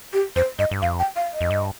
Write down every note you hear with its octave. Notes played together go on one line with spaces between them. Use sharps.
G4
F2 C5
G2 D#5
G2
F2 F5
G5
F5
D#5
F2
G2